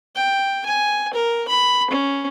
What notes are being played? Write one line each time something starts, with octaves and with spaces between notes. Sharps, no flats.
G5
G#5
A#4
B5
C#4